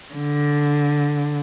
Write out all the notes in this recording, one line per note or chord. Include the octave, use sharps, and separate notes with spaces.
D3